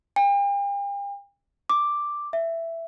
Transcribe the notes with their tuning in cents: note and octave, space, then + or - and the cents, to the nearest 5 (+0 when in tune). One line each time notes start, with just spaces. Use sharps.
G5 +40
D6 +5
E5 +10